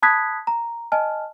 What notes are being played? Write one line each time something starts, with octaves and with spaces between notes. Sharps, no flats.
A5 B5 D#6 F#6 G#6 B6
A#5
D#5 G#5 A5 F6